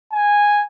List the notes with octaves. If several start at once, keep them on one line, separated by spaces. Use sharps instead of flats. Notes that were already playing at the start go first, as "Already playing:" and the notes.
G#5